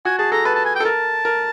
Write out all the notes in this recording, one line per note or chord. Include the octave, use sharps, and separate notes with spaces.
F#4 G#5
G#4 A5
A4 A#5
B4 A5
A5
G#5
G5
A4
A#4 A5
A#4